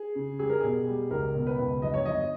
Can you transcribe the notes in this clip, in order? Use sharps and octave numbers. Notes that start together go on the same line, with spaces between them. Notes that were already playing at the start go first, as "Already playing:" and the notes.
Already playing: G#4
C#3
G3 G#4
A#4
B2 G#4
G3
C#2 A#4
B2
B4
C#2
G1 D#5
C#5
G1 D#5